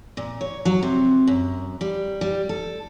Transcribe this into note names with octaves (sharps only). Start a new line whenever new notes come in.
A#2
C#5
F#3
C3
F#2
G3
G3
A4